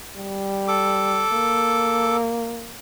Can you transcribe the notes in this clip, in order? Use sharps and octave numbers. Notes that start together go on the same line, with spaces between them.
G3
A4 D6
A#3